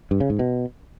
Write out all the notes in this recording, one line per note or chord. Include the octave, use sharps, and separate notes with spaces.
G2
C#3
G#2
B2